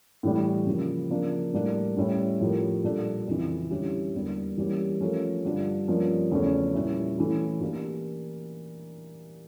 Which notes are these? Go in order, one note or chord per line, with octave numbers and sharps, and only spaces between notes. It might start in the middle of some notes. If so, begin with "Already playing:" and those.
A2 E3 G3
C#3 F3 A#3
C#3 F3 A#3 D4
A2 G3 A#3 D4
A2 G3 C#4 E4
A2 F3 C#4 G4 A#4
A#2 G3 D4 A4
F2 C#3 E3
D3 G3 C#4 E4 G4
E2 D3 G3 A#3
E3 G3 A#3 C#4 G4
F3 A3 C#4 F4 A#4
G2 D3 G3 D4 F4
G2 F3 A#3 C#4
E2 C#3 F3 A3 C#4
A#2 G3 C#4 E4
E3 A3 C#4 E4
E3 A#3 D4 G4 A#4